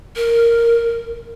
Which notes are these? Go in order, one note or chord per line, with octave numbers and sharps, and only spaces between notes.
A#4